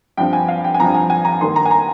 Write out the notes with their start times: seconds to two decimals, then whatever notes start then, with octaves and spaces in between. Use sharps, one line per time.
0.17 G2 F3 C4 G5
0.33 G#5
0.48 F5
0.64 G5
0.74 G#5
0.79 G2 F3 C4 A#5
0.94 G#5
1.10 G#5
1.25 A#5
1.41 G2 D#3 A#3 C6
1.56 A#5
1.65 G#5
1.71 A#5